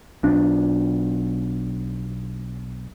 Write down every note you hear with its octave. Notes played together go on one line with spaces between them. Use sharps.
B1 D4